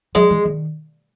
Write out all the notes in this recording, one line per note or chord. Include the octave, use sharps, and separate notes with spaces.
F#3 G#3
E3
D#3